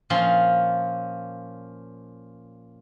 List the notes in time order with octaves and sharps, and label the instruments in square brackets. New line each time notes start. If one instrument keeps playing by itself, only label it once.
[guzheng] A#2 F3 C#4 C6